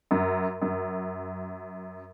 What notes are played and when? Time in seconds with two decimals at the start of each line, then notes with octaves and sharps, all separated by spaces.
0.11 F#2
0.62 F#2